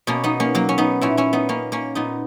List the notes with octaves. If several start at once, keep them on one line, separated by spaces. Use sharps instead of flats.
B2 A#3 C#4
B3 D#4
A#3 C#4
F#3 A#3
C#4
B3 D#4
A#2 C#4 E4
C#4 E4
B3 D#4
A#3 C#4
A#3 C#4
A#2 B3 D#4